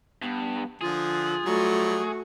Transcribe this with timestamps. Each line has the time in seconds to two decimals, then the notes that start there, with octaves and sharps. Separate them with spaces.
0.22 G2 B3
0.81 D3 F3 F4 G#4
1.46 F#3 G3 A3 F#4